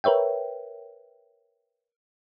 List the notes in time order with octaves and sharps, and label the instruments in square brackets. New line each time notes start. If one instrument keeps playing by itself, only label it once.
[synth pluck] A#4 B4 C#5 E5 G5